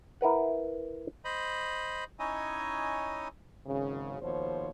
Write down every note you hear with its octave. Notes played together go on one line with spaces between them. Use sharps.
E4 A#4 B4 F#5
C5 D#5 B5
C#4 D#4 E4 C#5 D#5 G#5
G#1 F#2 C#3
D#2 B2 F3 C5 C#5